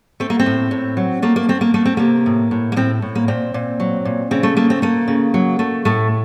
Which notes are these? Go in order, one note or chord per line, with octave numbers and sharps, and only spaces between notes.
A3 C4
A#3
C4
A2
A2
F#3
A3 A#3
A#3
A3 C4
A#3
A3 A#3
C4
C3 A#3
A2
A2
A#3
A2 C4
A2
A#3
A#2 C4
A#2
F#3
A#2
C#3 C4
A3
A3 A#3
C4
A3 A#3
C#3
F#3
A3
A2 A3